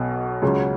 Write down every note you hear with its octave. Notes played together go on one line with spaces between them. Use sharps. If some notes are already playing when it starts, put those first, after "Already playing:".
Already playing: B1 B2 F#3
C#2 C#3 F#3